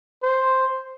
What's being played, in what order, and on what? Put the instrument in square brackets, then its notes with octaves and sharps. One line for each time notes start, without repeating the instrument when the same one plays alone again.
[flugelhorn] C5